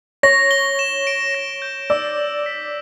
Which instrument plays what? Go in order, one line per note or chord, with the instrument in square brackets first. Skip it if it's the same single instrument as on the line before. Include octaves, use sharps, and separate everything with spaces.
[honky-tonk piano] C#5 [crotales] A#6
[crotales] G7
E7
D7
A#6
G6
[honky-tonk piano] D5 [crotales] E6
[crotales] F#7
B6